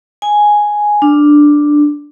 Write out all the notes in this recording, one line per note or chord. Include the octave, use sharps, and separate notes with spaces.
G#5
D4